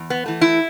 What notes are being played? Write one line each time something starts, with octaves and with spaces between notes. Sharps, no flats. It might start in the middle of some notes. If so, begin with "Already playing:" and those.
Already playing: E2
B3
E3 A3
E4